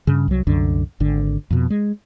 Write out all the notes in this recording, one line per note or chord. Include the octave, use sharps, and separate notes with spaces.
G2 C#3
C2 F#3
C2 F#2 D3
G#1 D3
F2 B2
G#3